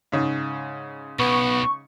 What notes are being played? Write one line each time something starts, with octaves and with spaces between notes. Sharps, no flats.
G#2 C#3
B1 B3 C#6